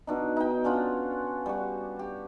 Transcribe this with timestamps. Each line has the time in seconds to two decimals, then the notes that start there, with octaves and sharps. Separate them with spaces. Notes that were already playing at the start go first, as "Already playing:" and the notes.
0.07 B2 D4 D#4
0.36 D#4 G5
0.64 C#4 D4 F4 F#5
1.46 G3 F#4
1.99 G4